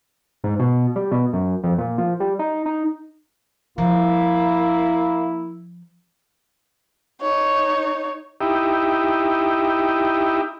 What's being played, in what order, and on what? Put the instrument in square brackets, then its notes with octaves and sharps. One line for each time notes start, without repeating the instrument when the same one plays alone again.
[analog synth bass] G#2
B2
G3
B2
F#2
F2
A#2
F3
G3
D#4
D#4
[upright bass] F3 [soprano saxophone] A#3 [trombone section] E4
[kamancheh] D#4 C#5
[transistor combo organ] D#4 E4 G4